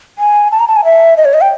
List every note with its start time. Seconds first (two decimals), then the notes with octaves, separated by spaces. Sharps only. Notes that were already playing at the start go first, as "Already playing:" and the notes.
0.18 G#5
0.52 A5
0.60 A#5
0.68 A5
0.76 G#5
0.85 E5
1.17 D#5
1.25 C#5
1.34 D#5
1.41 G5